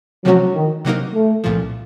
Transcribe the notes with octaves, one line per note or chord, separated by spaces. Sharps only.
C3 F3 F#3 A3 C#4 F#4
D#3
C3 F#3 A#3 D#4 A#4
A3
C2 A#2 F3